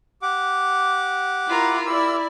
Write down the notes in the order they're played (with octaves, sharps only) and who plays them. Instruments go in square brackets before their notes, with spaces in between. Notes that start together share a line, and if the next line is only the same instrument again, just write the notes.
[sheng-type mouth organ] G4 F#5 D6
[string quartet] E4 F4 A#4
[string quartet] E4 D5 [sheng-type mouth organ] G4 A#4 E6